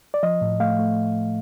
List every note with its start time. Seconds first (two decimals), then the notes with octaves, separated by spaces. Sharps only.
0.14 D5
0.23 F3 D#5
0.41 A2
0.60 A3 F5
0.79 A3